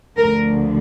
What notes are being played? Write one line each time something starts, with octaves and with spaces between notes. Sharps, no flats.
D2 D3 F3 A#4